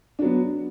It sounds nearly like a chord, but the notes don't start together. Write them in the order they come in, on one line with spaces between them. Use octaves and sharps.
D4 F#3 B3